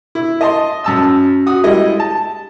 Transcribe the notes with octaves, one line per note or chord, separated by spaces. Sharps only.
E4
D#5 A5 C6
F#2 A5 E6
F#4 D#6
G3 G#3 E4 D#5
A5